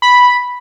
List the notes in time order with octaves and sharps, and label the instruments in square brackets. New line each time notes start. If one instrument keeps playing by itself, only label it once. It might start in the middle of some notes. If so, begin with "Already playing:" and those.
[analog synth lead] B5